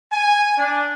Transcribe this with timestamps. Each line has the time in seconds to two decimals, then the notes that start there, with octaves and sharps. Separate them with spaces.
0.12 G#5
0.58 D4